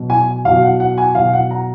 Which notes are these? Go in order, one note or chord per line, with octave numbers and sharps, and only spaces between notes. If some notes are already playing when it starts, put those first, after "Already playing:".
Already playing: B2 F#3
G#5
B2 F#3 F5
F#5
F#5
G#5
B2 F#3 F5
F#5
A#5